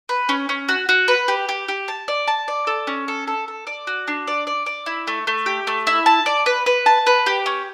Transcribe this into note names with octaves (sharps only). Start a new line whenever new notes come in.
B4
C#4
C#4
F#4
F#4
B4
G4
G4
G4
A5
D5
A5
D5
A4
C#4
A4
A4
A4
D5
F#4
D4
D5
D5
D5
E4
A3
A3
G4
A3
E4
A5
D5
B4
B4
A5
B4
G4
C#4